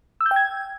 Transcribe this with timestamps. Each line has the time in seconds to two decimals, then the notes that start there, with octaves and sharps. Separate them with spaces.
0.21 E6
0.26 G6
0.31 G5
0.36 G#6